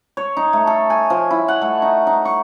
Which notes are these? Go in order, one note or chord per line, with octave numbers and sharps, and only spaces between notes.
C#5
D#4
A3
A4
G#5
F3
E4
F#5
A3
D#4
D#4
C#6